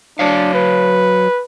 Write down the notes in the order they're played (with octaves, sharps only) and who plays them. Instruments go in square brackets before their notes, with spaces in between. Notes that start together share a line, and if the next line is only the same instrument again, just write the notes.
[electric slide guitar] F#3 C#5 F5 [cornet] D4
[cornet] B4